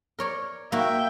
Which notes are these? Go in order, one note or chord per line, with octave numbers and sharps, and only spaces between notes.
A#4 C#5 D5
A#3 F#4 E5 G5